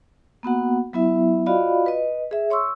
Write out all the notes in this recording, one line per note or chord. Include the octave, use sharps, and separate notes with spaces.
A#3 B3 F#4 F#5
F#3 B3 E4 E5
F4 F#4 D5 D#5 F5 B5
B4 D#5
G#4 E5
C#5 C6 C#6 E6